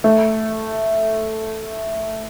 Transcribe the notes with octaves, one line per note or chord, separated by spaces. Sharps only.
A3